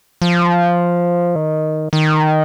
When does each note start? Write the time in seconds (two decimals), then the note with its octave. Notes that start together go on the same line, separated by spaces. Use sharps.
0.22 F3
1.35 D#3
1.93 D#3